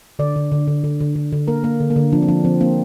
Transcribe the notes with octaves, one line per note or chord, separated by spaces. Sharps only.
D3 D5
D3
D3
D3
D3
D3
D3
D3
A#3 A#4
A#3
D3
A#3
D3
F3 D4
C4
F3 D4
F3 C4
A#3 C4